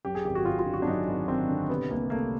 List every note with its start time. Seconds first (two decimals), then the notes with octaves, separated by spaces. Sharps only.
0.05 F#2 G4
0.15 G#4
0.25 G#1 G4
0.35 F#4
0.45 G#1 F4
0.59 F4
0.66 D3
0.74 F#4
0.82 D4
0.86 F#2 D#4
1.08 G#1
1.28 G#1 C4
1.48 D3
1.70 C3 B3
1.90 C2 A#3
2.10 A3 A#3